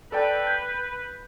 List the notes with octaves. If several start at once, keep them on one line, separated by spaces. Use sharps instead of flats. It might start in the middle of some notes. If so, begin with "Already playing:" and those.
A4 B4 D5 G5
G6 B6